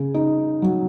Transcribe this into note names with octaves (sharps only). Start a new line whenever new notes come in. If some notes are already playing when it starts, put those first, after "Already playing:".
Already playing: C#3
D#4
F#3